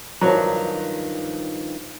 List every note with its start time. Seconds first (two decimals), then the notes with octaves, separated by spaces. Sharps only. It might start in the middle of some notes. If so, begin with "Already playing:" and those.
0.21 G2 D#3 F3 F#3